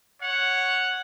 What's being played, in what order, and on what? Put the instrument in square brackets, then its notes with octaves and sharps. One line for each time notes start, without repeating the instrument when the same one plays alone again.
[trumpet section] C#5 F#5